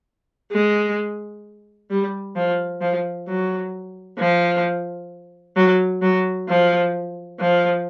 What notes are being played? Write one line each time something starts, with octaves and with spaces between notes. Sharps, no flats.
G#3
G3
F3
F3
F#3
F3
F#3
F#3
F3
F3